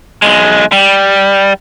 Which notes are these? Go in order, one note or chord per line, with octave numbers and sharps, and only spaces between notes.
B1 G#3
G3